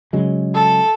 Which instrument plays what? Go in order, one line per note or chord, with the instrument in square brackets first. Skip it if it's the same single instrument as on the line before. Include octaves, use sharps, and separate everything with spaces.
[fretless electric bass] C#3 F#3 G#3
[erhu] A4